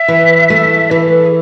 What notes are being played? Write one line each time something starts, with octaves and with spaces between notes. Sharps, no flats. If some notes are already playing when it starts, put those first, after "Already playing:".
Already playing: E5
E3
A3
E3 A4
B4
A4
G#4